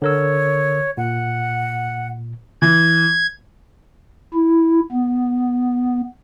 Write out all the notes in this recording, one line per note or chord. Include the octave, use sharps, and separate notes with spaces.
D3 A#4 C#5 E6
A#2 F#5
E3 G#6
E4
B3